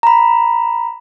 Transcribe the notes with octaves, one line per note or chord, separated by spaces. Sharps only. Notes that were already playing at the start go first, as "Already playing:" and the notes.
A#5 B5